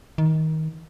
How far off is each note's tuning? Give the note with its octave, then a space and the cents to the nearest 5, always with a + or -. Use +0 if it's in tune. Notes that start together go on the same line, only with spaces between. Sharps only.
D#3 +20